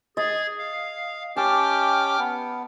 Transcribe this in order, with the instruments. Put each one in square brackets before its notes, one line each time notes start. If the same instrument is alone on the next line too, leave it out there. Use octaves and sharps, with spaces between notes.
[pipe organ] G#4 G#6 A6 [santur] D#5
[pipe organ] F5
[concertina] C#4 G4 [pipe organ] G5 D6 F6 [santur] A5
[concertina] B3